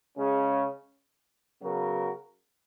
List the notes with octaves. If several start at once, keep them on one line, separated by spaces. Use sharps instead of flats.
C#3 G#3 C#4
C#3 F#3 B3 F#4 A#4